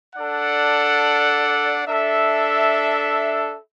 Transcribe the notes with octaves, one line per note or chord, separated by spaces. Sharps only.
D4 A4 D5 F#5
D4 A4 E5